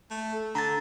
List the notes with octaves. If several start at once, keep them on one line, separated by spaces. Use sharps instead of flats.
A3
A4
D3 A#5 A6